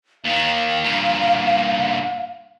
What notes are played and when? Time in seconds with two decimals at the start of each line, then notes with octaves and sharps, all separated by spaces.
0.24 D#2 D#3 F5
0.84 G2 A#2